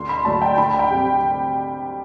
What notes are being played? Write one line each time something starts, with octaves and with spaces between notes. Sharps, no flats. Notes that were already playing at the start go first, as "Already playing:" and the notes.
Already playing: D2 C6
B5
D3 F#3 A3 D4 A5
G5
D2 B5
G5
C3 G3